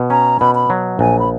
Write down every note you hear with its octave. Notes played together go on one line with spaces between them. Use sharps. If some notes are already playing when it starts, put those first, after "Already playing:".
Already playing: B2
C#4 A#5
B2 B5
B5
F#3
A#1 G#5
B5